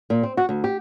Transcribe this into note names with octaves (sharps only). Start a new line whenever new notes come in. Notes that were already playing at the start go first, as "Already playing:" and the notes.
A#2
C4
F#4
D2
G4